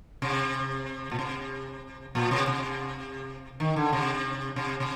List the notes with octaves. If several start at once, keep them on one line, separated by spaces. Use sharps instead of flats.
C3
A#2
C3
A#2
C3
C3
D#3
D3
C3
C3
C3